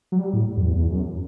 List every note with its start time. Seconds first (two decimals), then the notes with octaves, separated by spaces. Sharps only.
0.12 F#3
0.18 G3
0.33 A2
0.57 F#2
0.63 E2
0.76 E2
0.91 F#2